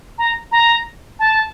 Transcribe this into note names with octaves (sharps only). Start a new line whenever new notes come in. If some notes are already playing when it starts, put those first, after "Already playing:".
A#5
A#5
A5